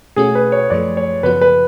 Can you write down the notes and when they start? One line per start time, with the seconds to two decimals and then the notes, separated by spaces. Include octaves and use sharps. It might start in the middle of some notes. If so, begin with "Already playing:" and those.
0.16 B2 A3 C#4 F#4 G#4
0.35 B4
0.52 C#5
0.70 F#2 F3 A3 D5
0.97 C#5
1.23 F#2 C#3 F3 B3 F#4 B4
1.41 B4